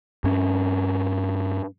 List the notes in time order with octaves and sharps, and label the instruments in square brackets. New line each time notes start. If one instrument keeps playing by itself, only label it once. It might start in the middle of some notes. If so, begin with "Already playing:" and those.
[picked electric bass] G2 C#4